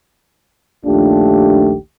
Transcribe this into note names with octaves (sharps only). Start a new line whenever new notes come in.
A#1 D#2 A3 D4 F4 G4